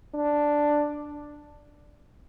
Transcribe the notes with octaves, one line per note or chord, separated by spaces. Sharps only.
D4